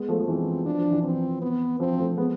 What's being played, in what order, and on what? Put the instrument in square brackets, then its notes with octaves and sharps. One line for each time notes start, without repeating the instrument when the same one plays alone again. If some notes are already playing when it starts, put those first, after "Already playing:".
Already playing: [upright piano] G#3 B3
F3 A3
F3
[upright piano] E3 G#3 [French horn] C4
[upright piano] F3 [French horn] D4
[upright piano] F3
E3
[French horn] C4
B3
[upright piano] F3 [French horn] C4
[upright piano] F3 A3
G#3 B3